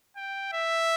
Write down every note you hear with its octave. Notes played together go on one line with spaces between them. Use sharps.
G5
E5